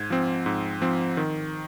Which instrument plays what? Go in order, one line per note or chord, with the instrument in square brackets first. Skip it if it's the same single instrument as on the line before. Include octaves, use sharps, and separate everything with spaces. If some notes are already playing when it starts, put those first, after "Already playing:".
Already playing: [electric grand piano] G#2 G#6
F3 C4
G#2
F3 C4
D#3